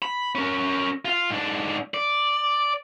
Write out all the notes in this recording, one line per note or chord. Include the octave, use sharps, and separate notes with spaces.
B5
C#4 A#4
F4 F5
G#2 D4
D5